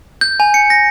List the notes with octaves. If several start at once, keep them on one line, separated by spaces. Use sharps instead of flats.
G6
G#5
C#7
A#6